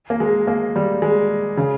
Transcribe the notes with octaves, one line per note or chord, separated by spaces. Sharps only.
A#3
G#3
A#3
G3
G#3
C#3